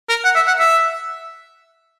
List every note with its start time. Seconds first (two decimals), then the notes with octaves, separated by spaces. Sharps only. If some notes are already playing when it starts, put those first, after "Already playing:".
0.09 A#4
0.25 F#5
0.36 E5
0.47 F#5
0.59 E5